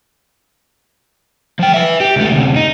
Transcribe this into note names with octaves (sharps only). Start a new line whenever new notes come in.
F3 G5
B4 E5
G4
C#2 A3
D2 C3
D#4